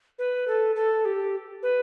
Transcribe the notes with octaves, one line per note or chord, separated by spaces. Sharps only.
B4
A4
A4
G4
B4